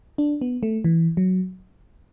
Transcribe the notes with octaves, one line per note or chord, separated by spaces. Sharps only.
D4
B3
A3
E3
F#3